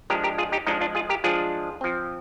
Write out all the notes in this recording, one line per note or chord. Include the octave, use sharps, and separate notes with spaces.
F3 G#3 D4 G4 A#4
G4 A#4
F4 G#4
D#4 G4
F3 G#3 D4 D#4
D4 F4
F4 G#4
G4 A#4
F3 G#3 D4 F4 G#4
F3 C4